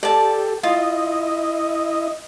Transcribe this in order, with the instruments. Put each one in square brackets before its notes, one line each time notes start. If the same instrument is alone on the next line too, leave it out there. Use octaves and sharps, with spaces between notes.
[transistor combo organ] G4 A4 [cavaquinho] D5 A5
[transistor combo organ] E4 D#5 [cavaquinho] F4